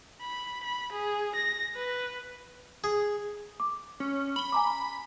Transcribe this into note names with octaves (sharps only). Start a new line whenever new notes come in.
B5
B5
G#4
A#6
B4
G#4
D6
C#4
B5 F#7 G7
G#5 A#5 D6